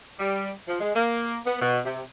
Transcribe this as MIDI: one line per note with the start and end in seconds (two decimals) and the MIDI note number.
0.19 0.50 55
0.68 0.79 53
0.81 0.93 56
0.96 1.38 58
1.46 1.58 59
1.61 1.79 47
1.85 2.01 48